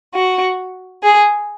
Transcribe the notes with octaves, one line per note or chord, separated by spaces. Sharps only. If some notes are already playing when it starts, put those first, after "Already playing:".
F#4
G#4